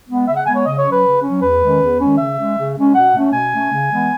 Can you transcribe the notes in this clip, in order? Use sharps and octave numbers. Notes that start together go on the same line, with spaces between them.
G#3 B3
C#3 E5
F#5
G#3 B3 G#5
C#5
C#3 D#5
C#5
F#3 C#4
B4
C#3
F#3 C#4
E2 B4
D#3 G#3 C#4
E2
D#3 G#3 C#4
C#3 E5
G#3 C#4
C#3
G#3 C#4
B2 F#5
A3 C#4
B2 G#5
A3 C#4
C#3
E3 G#3 B3